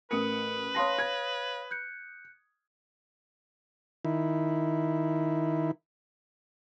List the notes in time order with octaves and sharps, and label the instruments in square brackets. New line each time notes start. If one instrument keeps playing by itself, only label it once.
[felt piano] A1 D#6 C#7 [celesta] A#4 [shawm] B4
[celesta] C#5 F5 A#6 [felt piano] A5 C6 D#6
[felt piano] G#6
[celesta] F#6 G6 C#7
[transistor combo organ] D#3 E4